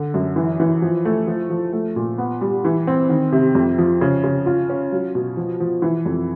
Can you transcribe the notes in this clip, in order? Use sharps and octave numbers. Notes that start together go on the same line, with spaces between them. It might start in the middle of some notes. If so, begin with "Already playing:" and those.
Already playing: D3
F#2
E3
E3
F3
A3
F3
F3
A3
A#2
B3
G3
E3
C4
D#3
C3
F2
F3
C#3
C#3
F4
C#4
F#3
B2
F3
F3
E3
F2